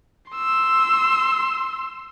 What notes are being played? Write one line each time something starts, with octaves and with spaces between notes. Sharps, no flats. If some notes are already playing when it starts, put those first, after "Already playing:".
C6 E6